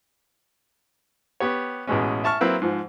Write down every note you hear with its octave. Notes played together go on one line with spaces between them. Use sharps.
B3 G4 C#5
A1 B2 G#3 C#4
E5 A5 C#6 F6
F#3 A#3 C4 E4 B4
G#2 F3